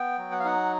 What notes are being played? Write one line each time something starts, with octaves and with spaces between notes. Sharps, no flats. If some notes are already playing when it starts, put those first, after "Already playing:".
Already playing: B3 G5
F#3
F#5
F5
D#4 F#5